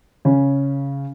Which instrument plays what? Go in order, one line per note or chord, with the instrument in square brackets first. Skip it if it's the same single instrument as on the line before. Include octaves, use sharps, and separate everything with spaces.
[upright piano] C#3 C#4